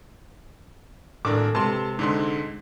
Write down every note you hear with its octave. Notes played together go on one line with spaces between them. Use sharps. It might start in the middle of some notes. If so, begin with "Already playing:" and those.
G#1 A2 D4 A4 A#4 D6
C3 G#3 G4 A4 B4 A5 C6
G#2 D3 D#4 C6